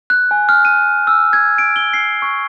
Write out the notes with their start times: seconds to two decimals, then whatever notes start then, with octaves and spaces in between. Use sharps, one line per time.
0.10 F#6
0.31 G#5
0.49 F6
0.65 D#7
1.07 E6
1.33 G#6
1.58 D7
1.76 G7
1.93 C7
2.22 C#6